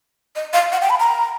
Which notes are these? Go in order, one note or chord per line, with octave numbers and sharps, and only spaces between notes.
D#5
F5
F#5
G5
B5
A#5